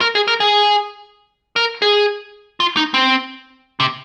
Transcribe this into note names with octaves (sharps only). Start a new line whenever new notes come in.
A#4
G#4
A#4
G#4
A#4
G#4
F4
D#4
C4
C3